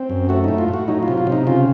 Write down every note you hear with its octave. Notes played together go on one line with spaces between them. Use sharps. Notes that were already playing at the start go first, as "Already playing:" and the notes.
Already playing: C4
F#2
A3 F#4
A2 D#4
F4
A2
F#4
F#3 D#4
F4
C3
F4
C3
D#4
C#3 F4